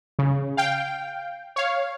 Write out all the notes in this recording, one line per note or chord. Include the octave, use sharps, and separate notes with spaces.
C#3
F5 G5
C#5 F5